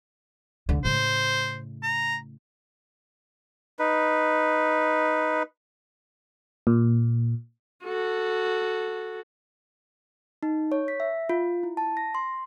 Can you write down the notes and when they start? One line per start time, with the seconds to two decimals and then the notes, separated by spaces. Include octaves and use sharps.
0.69 D2 D3
0.85 A2 C#3 C5
1.83 A#5
3.79 D#4 B4
6.67 A#2
7.84 F#4 A4
10.43 D#4
10.72 C#5
10.88 B6
11.00 E5
11.29 F4
11.63 E4
11.77 A5
11.97 A#6
12.15 C6